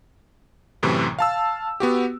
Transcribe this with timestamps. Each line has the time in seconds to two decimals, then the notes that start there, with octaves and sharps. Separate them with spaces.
0.83 F#2 A2 C3 E3
1.19 F5 A5 E6
1.80 B3 F#4 G4